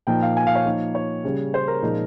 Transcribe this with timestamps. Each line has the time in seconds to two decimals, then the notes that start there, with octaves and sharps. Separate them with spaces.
0.07 A#2 F3 A#3 D#4 G5
0.22 F5
0.37 G#5
0.47 F5
0.55 C#5
0.66 F3 A#3 D#4
0.95 C#5
1.24 C#3 G3 C#4
1.54 C5
1.68 A#4
1.83 A#2 F3 G#3 D#4